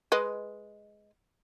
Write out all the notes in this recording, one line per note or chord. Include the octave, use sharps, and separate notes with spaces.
G#3 B4 D#5